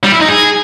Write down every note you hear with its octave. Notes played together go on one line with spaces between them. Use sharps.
G3
E4
D#4
G#4